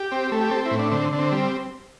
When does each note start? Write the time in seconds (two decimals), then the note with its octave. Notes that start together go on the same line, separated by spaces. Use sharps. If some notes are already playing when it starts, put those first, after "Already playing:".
Already playing: G4
0.12 C4
0.32 A3
0.41 G4
0.51 C4 A4
0.66 E4
0.71 A2
0.79 D4
0.91 D3 C4
1.13 D3
1.19 C4
1.32 G3